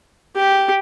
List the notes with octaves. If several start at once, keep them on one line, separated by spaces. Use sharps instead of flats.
G4